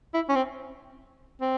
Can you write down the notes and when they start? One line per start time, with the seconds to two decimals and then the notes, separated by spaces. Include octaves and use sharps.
0.14 E4
0.29 C#4
0.36 C4
1.41 C4